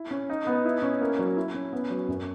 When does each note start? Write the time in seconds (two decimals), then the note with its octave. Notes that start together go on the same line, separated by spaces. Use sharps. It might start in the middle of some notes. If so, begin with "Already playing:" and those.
Already playing: E4
0.11 C#4
0.30 D#4
0.47 B3
0.65 E4
0.82 C#4
1.01 A#3
1.19 F#3
1.37 E4
1.55 C#4
1.73 B3
1.90 F#3
2.08 F#2